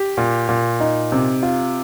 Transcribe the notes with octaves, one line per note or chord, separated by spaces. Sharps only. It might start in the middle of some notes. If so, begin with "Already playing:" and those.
Already playing: G4
A#2
A#2
D#4
C3
F4